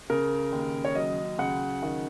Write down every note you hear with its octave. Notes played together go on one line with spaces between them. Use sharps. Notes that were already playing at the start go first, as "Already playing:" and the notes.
C#3 A#4
D#2
C#5
F#3 D#5
C#3 F#5
D#3